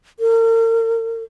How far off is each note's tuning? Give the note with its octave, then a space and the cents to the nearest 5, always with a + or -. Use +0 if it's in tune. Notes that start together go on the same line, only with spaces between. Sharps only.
A#4 -40